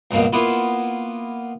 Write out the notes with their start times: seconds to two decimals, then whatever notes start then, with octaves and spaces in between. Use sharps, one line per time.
0.11 C#2 G2 B2 A#3
0.33 A#3 B3 E4 F4